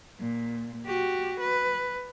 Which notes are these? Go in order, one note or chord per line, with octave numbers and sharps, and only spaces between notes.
A#2
F#4 G4
B4